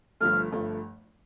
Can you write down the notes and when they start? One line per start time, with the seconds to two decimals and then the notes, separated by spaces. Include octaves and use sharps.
0.20 G1 G2 F3 A3 F6
0.52 G1 G2 F3 A3